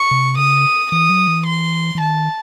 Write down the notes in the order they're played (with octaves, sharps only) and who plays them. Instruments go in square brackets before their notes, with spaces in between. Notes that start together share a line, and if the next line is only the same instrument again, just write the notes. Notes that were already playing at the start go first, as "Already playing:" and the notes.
Already playing: [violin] C#6
[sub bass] C3
[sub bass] C#3 [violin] D#6
[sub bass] E3 [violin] D#6
[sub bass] F#3
E3
[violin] C6
[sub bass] E3
[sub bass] D#3 [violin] A5